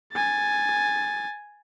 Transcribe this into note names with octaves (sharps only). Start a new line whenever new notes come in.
G#5 A6